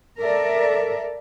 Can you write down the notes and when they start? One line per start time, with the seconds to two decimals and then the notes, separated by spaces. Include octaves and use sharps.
0.19 A4 A#4 D5 E5